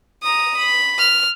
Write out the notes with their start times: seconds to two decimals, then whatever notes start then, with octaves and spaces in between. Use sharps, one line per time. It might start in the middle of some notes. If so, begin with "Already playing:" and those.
0.24 A#5 D#6
0.58 B5
0.99 F6